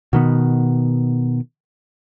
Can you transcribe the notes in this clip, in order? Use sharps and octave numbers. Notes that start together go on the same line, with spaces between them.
B2 D#3 B3